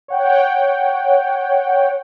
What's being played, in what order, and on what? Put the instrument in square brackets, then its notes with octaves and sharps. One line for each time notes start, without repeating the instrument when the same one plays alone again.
[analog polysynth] C#5 F#5 G5